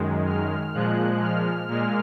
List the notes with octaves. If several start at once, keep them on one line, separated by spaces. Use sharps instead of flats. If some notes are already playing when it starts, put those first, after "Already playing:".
Already playing: F#2 D#3 G#3
F6
A#2 F3 G#3 F#6
F6
A#2 G#3 F6